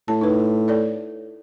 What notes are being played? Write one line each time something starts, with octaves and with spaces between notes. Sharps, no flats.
A2 A5
D#4 B4
A4 C#5 D5